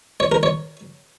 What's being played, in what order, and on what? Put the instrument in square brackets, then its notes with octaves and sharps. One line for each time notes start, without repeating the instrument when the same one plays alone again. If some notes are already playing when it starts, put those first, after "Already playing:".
[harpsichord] C#5
A#4
C#5